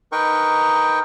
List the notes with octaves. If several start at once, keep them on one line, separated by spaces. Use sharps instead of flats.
D#4 A#4 B4 G5 C#6